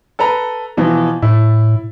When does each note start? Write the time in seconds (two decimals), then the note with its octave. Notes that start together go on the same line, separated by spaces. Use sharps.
0.19 A4 B4 A#5
0.77 B2 E3 F3
1.22 A2 E4